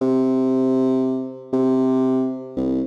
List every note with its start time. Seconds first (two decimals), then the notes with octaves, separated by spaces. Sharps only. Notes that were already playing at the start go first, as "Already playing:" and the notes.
0.01 C3
1.53 C3
2.57 C2